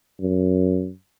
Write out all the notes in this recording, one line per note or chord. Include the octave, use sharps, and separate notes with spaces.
F#2